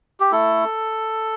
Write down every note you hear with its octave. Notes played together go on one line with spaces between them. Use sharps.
G4
A3 E4 A4